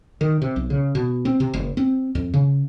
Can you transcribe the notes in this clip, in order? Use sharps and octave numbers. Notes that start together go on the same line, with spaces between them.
D#3
C3
B1
C#3
B2
C4
C3
F#1
C4
F2
C#3